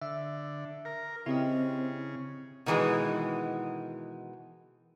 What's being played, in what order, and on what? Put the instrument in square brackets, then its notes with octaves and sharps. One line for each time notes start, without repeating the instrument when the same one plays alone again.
[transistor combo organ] D3 [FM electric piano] E5
[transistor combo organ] A#4
[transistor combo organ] C#3 [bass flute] C4 [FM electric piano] E4 G4 D#5
[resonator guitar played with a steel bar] B2 D#3 E3 G3 G#3 B3